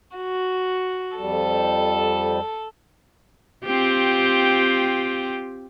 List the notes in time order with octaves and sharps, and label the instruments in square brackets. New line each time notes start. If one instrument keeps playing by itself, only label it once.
[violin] F#4
[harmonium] F2 G3 [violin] A4
[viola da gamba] C4 F4 G4